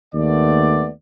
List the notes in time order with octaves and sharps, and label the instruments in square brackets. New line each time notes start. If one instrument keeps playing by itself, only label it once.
[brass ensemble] D#2 A3 B3 D5